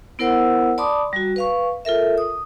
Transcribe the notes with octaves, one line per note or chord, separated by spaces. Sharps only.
B3 E4 A#4 C5 F#5 E6
D5 A5 B5 C6 D6 D#6
G3 F#4
B4 F5 C#6
F4 A4 A#4 E5
D#6